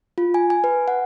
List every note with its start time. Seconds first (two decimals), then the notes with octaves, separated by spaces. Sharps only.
0.18 F4
0.34 G#5
0.50 G#5
0.64 B4
0.88 F#5